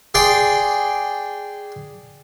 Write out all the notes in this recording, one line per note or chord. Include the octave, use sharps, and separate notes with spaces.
G#4 D5 G5 C6